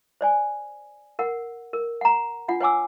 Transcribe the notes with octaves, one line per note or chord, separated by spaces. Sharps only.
C5 D5 G#5
A#4 F#5
A#4
F#5 A#5
D4 F4 F#5
B4 C#5 F#5 G#5 D6 E6